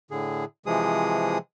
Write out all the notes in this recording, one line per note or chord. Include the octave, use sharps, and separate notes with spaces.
A2 D3 G#4
C3 E3 F3 G#3 G#4 D#6